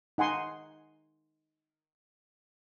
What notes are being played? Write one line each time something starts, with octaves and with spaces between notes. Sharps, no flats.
D#4 F#5 G#5 C6